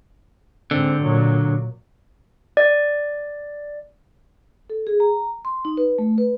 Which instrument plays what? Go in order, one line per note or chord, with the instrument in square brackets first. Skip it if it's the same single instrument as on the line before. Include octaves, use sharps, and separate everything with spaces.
[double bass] G#2 C4 [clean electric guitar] D3
[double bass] A#2 F#3
[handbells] D5
[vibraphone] A4
G#4
A#5
C6
D#4
B4
A3
B4